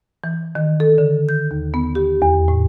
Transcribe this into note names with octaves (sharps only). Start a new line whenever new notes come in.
E3
D#3
A4
D3
G6
D#2
B3
G4
E2
A2